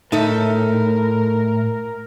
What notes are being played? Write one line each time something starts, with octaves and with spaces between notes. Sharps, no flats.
A2 D#4 A4 A#4 E5